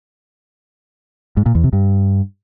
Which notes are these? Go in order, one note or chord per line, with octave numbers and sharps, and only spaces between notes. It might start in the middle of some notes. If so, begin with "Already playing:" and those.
G#2
A#2
E2
C3
G2